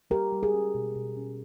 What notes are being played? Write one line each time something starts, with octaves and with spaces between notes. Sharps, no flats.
G3 G4 A#4
G3
G#4
C#4
B2
B2
C#4